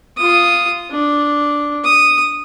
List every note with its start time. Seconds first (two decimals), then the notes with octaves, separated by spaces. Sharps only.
0.18 F4 D#6
0.91 D4
1.84 D#6